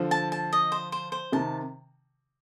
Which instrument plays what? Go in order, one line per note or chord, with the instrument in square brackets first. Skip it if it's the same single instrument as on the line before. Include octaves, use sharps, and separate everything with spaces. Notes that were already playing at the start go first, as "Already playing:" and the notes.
Already playing: [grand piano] D3 F3
[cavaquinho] A5
A5
D#5
C5
C5
C5
[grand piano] C3 D#3 [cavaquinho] A5